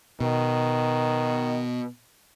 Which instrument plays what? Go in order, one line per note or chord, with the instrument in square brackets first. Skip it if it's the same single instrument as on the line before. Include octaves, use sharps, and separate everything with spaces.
[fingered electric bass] B2 [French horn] D#3